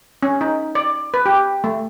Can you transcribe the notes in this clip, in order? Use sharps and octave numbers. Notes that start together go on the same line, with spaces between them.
C#4
D#4
D5
B4
G4
A3